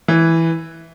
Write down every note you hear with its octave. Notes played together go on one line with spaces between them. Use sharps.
E3